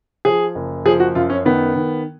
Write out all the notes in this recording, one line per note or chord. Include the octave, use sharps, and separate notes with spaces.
F3 G#4
F#1
F3 G#4
F#4
F#2 F4
C#4
D#3 B3
D#3